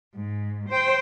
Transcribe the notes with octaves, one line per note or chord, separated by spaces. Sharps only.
G#2
C5 G5